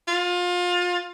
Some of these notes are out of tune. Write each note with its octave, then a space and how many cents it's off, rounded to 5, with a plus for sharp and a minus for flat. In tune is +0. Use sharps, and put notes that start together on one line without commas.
F4 +25